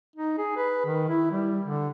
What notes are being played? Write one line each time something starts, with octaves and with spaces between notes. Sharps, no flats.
D#4
G#4
B4
D#3
E4
G3
D3